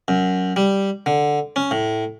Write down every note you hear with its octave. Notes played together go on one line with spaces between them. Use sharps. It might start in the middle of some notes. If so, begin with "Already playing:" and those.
F#2
G3
D3
C#4
A2